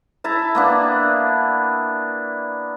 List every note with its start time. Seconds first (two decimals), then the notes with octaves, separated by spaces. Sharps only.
0.24 E4 E5 A5 A#5
0.55 A#3 B3 D4